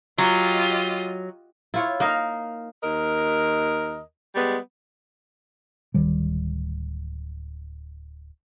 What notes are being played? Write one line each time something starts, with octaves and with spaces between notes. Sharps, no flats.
F#3 F4 G4 D#5
E4 F4 C#5
A#3 D#4 A#4 F5
D#2 A#4 D#5
G3 G#3 B3
D1 D#3 G3